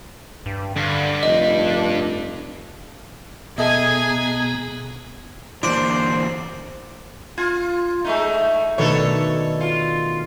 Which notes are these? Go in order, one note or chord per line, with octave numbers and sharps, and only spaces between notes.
G2
G2 D3
F1 D#5
D4
B2 B3 G#4 A4 D#5 E5 G#5 A#5
D3 E3 A#3 D4 C5
F4 G#6
G#3 A3 D#4
B2 D#3 A3 D4 A4 C#5
F4